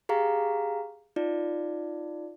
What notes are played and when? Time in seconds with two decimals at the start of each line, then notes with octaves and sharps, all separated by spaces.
0.09 G4 G#4 F5 A#5
1.16 D#4 F4 D5